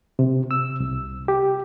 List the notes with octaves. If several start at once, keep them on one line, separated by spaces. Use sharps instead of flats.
C3
E6
C2
G4